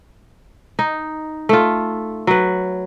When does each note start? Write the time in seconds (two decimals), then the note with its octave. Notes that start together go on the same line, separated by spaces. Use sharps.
0.79 D#4
1.49 A3 F4
2.27 F#3 B4